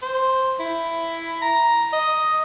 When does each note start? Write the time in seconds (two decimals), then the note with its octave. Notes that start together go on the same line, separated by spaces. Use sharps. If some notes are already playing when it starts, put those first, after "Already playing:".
0.02 C5
0.60 E4
1.42 A#5
1.93 D#5